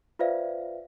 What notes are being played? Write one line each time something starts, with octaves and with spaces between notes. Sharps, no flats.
F4 B4 C5 D5 E5 F5